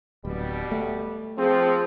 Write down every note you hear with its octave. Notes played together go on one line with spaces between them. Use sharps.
D1 B2 G3
A3
F3 C4 G#4